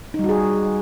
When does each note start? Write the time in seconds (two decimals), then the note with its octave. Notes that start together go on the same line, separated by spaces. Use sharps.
0.14 D#4
0.19 G3
0.24 F#4
0.29 G#4